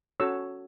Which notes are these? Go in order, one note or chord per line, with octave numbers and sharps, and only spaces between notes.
C#4 F#4 A4 C#5 E6